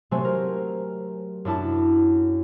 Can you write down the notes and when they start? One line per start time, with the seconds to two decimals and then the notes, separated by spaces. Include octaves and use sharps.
0.11 C3 F#3 A3 C4 C5 G#5
0.25 A#4
1.45 F#2 D4 E4 A5